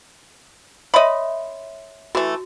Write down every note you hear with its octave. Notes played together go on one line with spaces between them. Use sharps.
C#5 D#5 E5 B5 C6
E3 A3 F#4